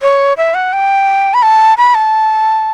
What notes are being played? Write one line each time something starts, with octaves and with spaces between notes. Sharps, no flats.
C#5
E5
F#5
G5
B5
A5
B5
A5